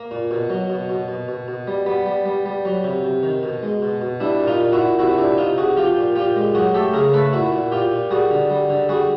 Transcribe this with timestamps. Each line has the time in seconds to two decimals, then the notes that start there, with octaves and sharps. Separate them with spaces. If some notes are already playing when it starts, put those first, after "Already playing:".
Already playing: A#3
0.11 A#2
0.31 B2
0.50 F#3
0.70 B2
0.89 B2
1.08 B2
1.28 B2
1.48 B2
1.67 G3
1.86 G3 B3
2.06 G3
2.26 G3
2.45 G3
2.65 F#3
2.84 C3
3.04 C3
3.23 D#3
3.43 B2
3.62 G#3
3.82 B2
4.01 B2
4.20 G3 D4 E4
4.40 A#2
4.47 D#4 F4
4.60 A#2
4.72 E4 F#4
4.79 A#2
4.99 C3 E4 F#4
5.18 C3 D4 E4
5.38 C3 D#4 F4
5.57 C3 F#4 G#4
5.77 F3 F4 G4
5.97 A#2
6.15 A#2 F4 G4
6.36 G#3
6.55 F#3 F#4 G#4
6.74 A3 G4 A4
6.94 C#3 G#4 A#4
7.14 A3 A4 B4
7.33 A#2 E4 F#4
7.53 A#2
7.72 A#2 F4 G4
7.92 A#2
8.10 G3 F#4 G#4
8.30 D3
8.50 G3
8.69 D3
8.89 G3 F#4 G#4